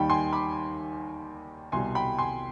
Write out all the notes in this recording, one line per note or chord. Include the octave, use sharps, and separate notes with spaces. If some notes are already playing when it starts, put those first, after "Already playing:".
Already playing: D#2 D#3 G3 G5 B5
G#5 C6
B5 D6
C2 B2 G3 G#5 C6
G5 B5
G#5 C6